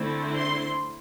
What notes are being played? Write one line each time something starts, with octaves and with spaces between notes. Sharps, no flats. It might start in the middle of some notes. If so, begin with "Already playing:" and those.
Already playing: D3 A3 C4 E4
C6